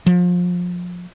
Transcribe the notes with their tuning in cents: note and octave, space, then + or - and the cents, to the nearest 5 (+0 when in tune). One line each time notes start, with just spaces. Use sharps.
F3 +25